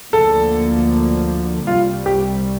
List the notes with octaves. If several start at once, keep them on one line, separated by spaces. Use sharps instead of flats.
D2 D3 F3 A#3 A4
C2 C3 G3 F4
G4